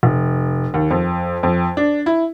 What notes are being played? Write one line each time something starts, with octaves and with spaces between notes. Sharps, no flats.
F1
D#2
F2
F2
D4
E4